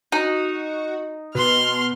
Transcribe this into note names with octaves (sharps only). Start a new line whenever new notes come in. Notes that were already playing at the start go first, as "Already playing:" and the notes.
D#4 F#4
B2 C6 F6